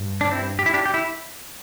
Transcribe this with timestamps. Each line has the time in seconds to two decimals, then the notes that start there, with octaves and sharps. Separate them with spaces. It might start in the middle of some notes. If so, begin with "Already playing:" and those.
Already playing: G2
0.21 D4
0.32 C4 E4
0.59 G4
0.66 E4
0.74 D4 G4
0.86 G4
0.94 E4